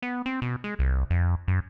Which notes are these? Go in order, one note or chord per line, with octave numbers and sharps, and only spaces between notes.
B3
C4
B2
G#3
C2
F2
F#2